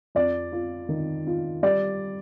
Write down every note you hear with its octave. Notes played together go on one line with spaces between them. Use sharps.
F2 D5
F4
D#3
F4
G3 D5